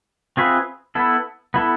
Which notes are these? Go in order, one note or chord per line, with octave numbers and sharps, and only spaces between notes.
C4 F4 G#4 B4 E5
B3 E4 A4
B3 E4 A4